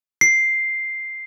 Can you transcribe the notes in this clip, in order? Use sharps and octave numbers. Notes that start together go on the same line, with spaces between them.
C7